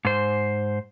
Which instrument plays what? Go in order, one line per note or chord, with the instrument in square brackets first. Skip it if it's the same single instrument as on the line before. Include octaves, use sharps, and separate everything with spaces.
[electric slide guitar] G#2 C5